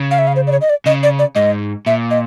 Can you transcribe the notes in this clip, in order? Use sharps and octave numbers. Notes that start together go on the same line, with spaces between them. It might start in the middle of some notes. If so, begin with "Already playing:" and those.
Already playing: C#3
F5
E5
F5
C5
D5
C#5
D#5
D5
C#3 D#5
D5
D5
G#2 D#5
A#2 E5
D#5